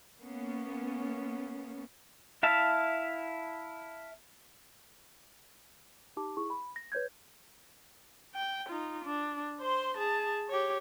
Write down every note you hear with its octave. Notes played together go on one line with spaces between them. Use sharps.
A#3 B3 C#4
E4 E5 F5 A5
D#4 G4 A5 D6
E4 G#4 C#6
B5
A#6
B4 C#5 G6 G#6
G5
D#4 F4
D4
C5 C6
G#4 A5
G4 C#5